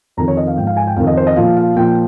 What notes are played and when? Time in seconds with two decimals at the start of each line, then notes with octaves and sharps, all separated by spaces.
0.17 F2 D#3 A#5
0.28 C#5
0.37 D#5
0.47 F5
0.57 G#2 F3 G5
0.67 F5
0.77 G#5
0.87 G5
0.96 F2 D#3 F5
1.07 D#5
1.17 C5
1.27 D#5
1.36 A#2 F3 F5
1.57 F5
1.76 A#2 F3 G5